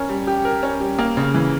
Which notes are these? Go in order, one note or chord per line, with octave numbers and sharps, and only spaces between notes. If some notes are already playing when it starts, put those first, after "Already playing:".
Already playing: C#4 A#4
G3
G4
A#4
C#4
G3
A#3
C#3
E3